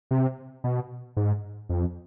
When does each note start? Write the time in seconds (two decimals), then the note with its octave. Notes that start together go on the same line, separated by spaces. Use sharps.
0.11 C3
0.64 B2
1.17 G#2
1.69 F2